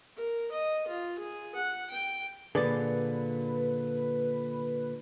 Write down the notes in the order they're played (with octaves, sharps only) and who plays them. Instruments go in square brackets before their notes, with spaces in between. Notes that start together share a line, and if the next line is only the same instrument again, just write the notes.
[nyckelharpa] A#4
D#5
F4
G#4
F#5
G5
[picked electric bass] A#2 D3 [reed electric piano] G#4 D5 A6 [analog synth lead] B4